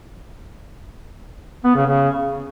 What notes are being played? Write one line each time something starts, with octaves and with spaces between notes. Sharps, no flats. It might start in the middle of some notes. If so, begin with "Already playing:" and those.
B3
C#3
C#3